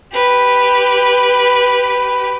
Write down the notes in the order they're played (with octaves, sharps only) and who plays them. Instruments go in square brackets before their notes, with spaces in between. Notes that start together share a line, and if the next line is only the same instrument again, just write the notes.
[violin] G4 B4